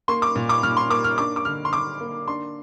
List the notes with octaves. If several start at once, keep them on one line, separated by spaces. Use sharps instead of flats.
A#3 C6
D6
A#2
D6
A#2 F6
C6
A#3 D6
F6
D4 D6
D6
D3 F6
C6
D3 D6
A#3
D4 C6